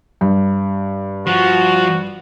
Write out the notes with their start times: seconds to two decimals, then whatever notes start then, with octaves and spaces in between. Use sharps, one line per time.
0.21 G2
1.27 F3 F#4